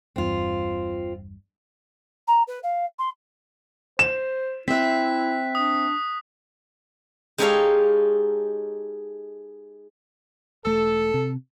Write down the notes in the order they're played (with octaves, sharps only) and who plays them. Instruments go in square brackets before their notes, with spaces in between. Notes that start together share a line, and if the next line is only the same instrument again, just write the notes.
[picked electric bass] G1 E2 G2 [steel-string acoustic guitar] C4 F4
[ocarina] A#5
B4
F5
C6
[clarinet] C5 [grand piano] E7
[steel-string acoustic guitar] C4 E5 [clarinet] E4 [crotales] F#6 B6
[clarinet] D4 [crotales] D#6
[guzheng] G#3 D#4 G4 A4 C#5 F5
[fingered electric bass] E1 A3 [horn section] A4
[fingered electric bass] C3